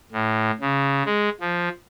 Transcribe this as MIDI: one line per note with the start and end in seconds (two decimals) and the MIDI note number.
0.12 0.51 45
0.61 1.03 49
1.05 1.29 56
1.41 1.69 53